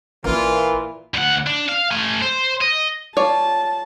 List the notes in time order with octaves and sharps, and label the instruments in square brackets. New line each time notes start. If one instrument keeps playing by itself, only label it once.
[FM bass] A1 [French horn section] A#2 E3 [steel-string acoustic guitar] A#3 A#4 [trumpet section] F4
[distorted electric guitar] D2 F#5
D4
F5
A3 G#5
C5
D#5
[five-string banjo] F4 C#5 D5 [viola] A5